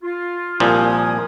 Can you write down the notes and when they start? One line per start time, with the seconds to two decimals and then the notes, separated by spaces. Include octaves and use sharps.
0.03 F4
0.60 C2 A#2 F3 A#4 G#5 D#6